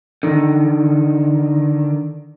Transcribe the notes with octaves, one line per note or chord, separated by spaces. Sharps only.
D3 D#3